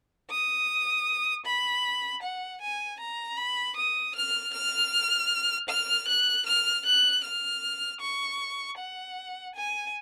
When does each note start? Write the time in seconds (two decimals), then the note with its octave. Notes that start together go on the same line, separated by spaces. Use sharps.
0.30 D#6
1.45 B5
2.22 F#5
2.61 G#5
2.99 A#5
3.37 B5
3.77 D#6
4.15 F6
4.54 F6
5.69 F6
6.08 F#6
6.46 F6
6.86 F#6
7.24 F6
8.01 C#6
8.78 F#5
9.55 G#5